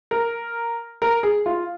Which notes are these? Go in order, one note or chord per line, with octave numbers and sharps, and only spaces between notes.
A#4
A#4
G#4
F4